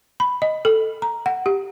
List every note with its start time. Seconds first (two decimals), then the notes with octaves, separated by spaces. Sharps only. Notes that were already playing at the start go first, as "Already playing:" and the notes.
0.20 B5
0.42 D#5
0.65 A4
1.02 A#5
1.26 F#5
1.46 G4